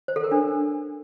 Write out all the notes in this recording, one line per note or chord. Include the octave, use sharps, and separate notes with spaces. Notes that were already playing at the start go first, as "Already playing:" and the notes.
C5
A4
A#4
D4